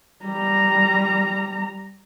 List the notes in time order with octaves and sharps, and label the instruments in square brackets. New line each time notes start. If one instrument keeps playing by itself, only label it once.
[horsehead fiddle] G3 A#5